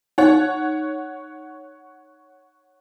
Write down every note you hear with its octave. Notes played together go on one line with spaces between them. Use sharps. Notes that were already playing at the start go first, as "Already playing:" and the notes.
D#4 C#5 F#5